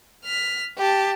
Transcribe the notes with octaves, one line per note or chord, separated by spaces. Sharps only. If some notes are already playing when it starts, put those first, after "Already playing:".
F6 B6
G4 A5